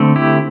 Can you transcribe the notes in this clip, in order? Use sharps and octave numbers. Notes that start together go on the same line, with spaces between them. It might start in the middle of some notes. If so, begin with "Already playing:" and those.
Already playing: D3 A3 C4
E4 G4